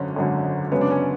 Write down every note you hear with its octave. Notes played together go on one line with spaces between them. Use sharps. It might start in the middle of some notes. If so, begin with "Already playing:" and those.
Already playing: G#1 F#2 D3 C#4
G#1 F#2 D3
G#1 F#2 C#3 B3
D4
C#4